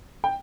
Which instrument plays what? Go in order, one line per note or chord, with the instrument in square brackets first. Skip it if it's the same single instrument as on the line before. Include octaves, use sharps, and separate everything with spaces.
[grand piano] G5